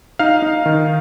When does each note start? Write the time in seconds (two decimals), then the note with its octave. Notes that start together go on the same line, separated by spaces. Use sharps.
0.19 D#4 F5 F6
0.42 D#4
0.66 D#3